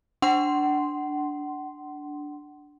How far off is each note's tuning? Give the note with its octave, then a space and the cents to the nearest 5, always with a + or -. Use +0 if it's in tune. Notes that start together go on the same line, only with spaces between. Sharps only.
D4 +0 F#5 +30 C6 +0